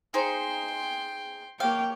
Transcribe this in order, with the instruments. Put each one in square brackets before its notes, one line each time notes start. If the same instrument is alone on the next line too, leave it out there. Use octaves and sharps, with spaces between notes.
[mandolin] D#4 G#4 C5 [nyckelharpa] G5 C6
[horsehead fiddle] A#3 G5 [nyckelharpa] G4 C#5 [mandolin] F5